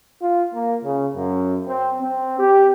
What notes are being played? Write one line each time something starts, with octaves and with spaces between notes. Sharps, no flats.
F4
A#3
C#3
F#2
C4
C4
G4